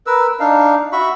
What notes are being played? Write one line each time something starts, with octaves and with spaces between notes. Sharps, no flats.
A#4 B4 E6
D4 D#4 F5
F#4 E5 B5 C#6